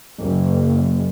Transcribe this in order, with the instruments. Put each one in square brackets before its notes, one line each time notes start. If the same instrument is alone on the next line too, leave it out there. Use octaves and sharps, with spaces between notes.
[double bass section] F#1